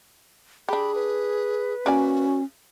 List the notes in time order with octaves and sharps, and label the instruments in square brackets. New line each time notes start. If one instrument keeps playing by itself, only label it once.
[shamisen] D4 G4 [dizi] G#4 [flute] B5
[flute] B4
[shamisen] A#3 D5 G#5 [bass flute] C#4 [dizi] F#4